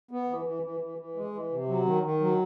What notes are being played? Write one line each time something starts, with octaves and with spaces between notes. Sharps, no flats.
B3
E3
E3
E3
E3
E3
G#3
E3
C3
F#3
D#3
D#3
F#3